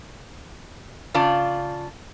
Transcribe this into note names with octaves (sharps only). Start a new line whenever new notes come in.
C#3 F4 D5 A5